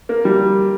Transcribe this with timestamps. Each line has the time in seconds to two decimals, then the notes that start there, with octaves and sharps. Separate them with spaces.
0.09 A#3
0.25 G3